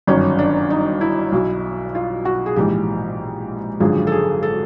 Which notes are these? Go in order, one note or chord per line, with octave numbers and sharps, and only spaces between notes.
G1 F#2 D#3 C#4
D4
D#4
E4
B1 B2
F4
F#4
G#4
A#1 G#2 E3 G4
G#1 F#2 D3 F3 G#4
A4
G#4
A4